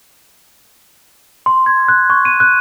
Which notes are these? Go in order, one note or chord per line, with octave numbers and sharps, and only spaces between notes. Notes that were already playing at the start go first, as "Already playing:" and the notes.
C6
G#6
F#6
C#6
D#7
F#6